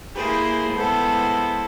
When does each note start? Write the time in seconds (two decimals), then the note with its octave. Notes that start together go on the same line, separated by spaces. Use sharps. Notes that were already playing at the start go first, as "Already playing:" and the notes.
0.15 A#3 E4 G4 G#4 B4 C5
0.74 G#3 B3 E4 A4 C5